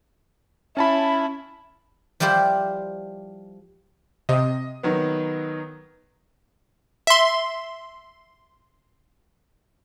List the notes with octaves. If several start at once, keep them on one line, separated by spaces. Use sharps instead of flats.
C#4 E4 A5 B5
F3 G3 E4 G4 C5
C3 D#5 D#6
D#3 F#3 B3
E5 C6